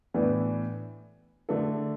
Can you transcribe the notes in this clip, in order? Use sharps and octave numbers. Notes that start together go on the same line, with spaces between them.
A2 E3 B3 D4
D3 A3 D4 A4